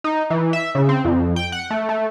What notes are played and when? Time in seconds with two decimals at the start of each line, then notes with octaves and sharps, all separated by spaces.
0.04 D#4
0.30 E3
0.53 E5
0.75 C#3
0.89 C4
1.05 F2
1.36 G5
1.52 F#5
1.70 A3
1.89 A3